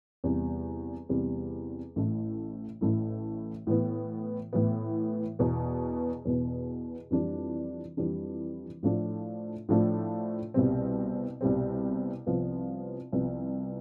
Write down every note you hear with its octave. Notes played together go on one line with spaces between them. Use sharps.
E2 C3 G3
E2 C3 G3
A1 A2 E3 A3 E4
A1 A2 E3 A3 E4
A2 E3 B3
A2 E3 B3
E2 B2 B3
E2 B2 B3
F2 E3 G3 D4
F2 E3 G3 D4
A2 F3 A3 D4
A2 F3 A3 D4
C2 B2 G3 C4
C2 B2 G3 C4
C2 C3 F3 B3
C2 C3 F3 B3